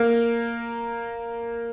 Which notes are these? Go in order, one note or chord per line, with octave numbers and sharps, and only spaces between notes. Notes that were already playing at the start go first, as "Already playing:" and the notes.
Already playing: A#3 A#4